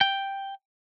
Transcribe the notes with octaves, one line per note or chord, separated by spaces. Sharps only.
G5